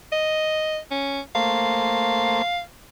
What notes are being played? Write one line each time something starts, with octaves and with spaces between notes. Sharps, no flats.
D#5
C#4
A3 A#3 C5 F5